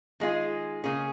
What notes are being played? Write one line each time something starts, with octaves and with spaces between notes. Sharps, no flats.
D#3 G#3 F4 G#4
C#3 A#3 C#4 G#4